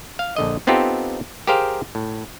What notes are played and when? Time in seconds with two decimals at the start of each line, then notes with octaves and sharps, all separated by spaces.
0.19 F5
0.36 A#1 D3 D#5
0.67 B3 C4 D#4 F4 G4 A4
1.47 G4 G#4 A#4 C5 F5 G5
1.95 A2